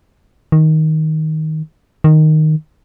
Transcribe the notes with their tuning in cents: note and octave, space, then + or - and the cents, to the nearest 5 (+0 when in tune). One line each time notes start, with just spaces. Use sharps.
D#3 +10
D#3 -5